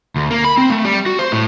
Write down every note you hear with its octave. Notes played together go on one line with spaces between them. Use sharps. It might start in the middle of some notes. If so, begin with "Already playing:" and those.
D2
A#3
B5
C4
A3
G3
F#4
C5
A2